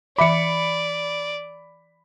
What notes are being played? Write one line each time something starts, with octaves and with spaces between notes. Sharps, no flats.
E3 D5 E5 B5 D6 C#7